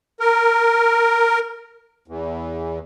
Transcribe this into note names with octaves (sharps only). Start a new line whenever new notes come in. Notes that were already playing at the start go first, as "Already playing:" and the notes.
A#4
E2